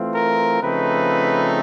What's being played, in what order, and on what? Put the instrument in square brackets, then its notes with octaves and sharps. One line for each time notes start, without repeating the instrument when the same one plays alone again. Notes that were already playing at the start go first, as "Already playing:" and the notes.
Already playing: [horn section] E3 A3 C4 F4
A#4
C#3 F3 A3 C4 D#4 B4